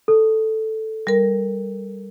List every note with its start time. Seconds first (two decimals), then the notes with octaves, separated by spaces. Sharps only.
0.08 A4
1.07 G3 A#4